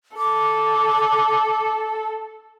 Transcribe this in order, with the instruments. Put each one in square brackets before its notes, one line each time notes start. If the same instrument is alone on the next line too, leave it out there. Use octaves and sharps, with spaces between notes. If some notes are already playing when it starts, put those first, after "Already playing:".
[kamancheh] A4 [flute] D6